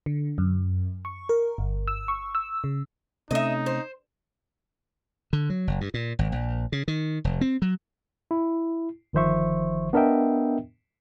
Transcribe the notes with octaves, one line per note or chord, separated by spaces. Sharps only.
D3
F#2
C#6
A#4
G1
E6
C#6
E6
C#3
C3 A3 C#4 D#4 D#5 E5
C5
D3
F#3
F#1
G2
A#2
G#1
A#1
C#3
D#3
F1
C4
F#3
E4
G1 D#3 F3 C5 E5 C#6
B3 D4 A#4 D#5 E5 G5